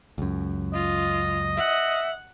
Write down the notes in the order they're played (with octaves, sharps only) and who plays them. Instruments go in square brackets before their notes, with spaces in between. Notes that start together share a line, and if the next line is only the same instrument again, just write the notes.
[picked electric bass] C#2 F#2
[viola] F4 [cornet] D#5
[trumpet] E5 [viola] F#5